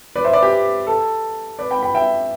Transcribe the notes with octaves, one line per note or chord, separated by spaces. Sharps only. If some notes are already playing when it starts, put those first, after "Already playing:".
B4 D5
C5 E5
B4 D5
G4
A4
B4 D5
G5 B5
G5 B5
E5 G5